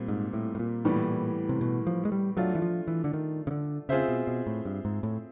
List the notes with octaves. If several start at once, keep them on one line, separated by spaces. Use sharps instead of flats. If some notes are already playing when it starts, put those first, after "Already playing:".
Already playing: A#2 G3 C4
G#2
A2
A2
A#2
A2 E3 G3 B3
C3
B2
F3
G#3
G3
F#3 A3 D4 F4
E3
F3
E3
D3
D#3
C#3
D3
C#3 C4 F4 G#4 C5 E5
B2
B2
A2
G2
G#2
A2